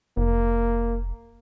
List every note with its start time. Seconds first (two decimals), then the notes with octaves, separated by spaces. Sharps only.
0.17 F1 A#3